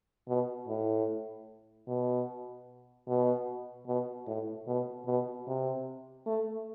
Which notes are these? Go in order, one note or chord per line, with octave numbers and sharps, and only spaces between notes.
B2
A2
B2
B2
B2
A2
B2
B2
C3
A3